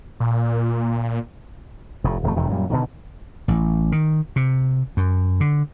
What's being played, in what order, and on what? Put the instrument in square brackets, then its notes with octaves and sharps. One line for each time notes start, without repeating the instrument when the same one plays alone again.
[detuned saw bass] A#2
[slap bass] F1 A2
D#1 F2 D3 A3
E1 F2 C3 D#3
F#2 A#2 F3 G3
B2 D3 D#3
A1
D#3
C3
F#2
D3